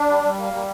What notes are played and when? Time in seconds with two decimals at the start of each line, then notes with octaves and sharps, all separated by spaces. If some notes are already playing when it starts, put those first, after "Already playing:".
Already playing: D4
0.09 G3
0.23 G3
0.38 A#3
0.53 G3